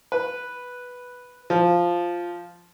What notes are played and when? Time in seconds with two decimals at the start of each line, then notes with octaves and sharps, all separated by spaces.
0.12 B4
1.50 F3